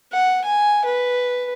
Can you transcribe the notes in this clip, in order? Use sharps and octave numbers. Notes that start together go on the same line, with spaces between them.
F#5
G#5
B4